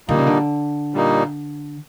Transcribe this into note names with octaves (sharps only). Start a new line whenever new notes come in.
A#2 D3 G3 A#3 D#4
C#3
D3
A#2 G3 A#3 D#4